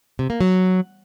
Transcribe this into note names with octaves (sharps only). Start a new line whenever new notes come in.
C3
A#3
F#3